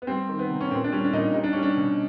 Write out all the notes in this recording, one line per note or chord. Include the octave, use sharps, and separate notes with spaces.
B3
G3 C4
D#3
B3
C3
C#4
A#2 C4
D4
G3 C#4
D4
A#2 D#4
G3 D#4
D4
G3 C#4
D4
B2